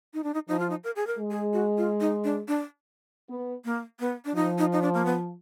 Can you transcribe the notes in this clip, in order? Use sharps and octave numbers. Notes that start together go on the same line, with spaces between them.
D#4
D4
D#4
F3 D#4
F4
D#4
A#4
G#4
A#4
G#3
G#4
F#4
F4
D#4
D4
D4
B3
A#3
B3
D4
F3 D#4
D#4
D#4
D4
A#3
B3